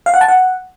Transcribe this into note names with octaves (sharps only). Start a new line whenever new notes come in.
F5
F#5
A5
F#5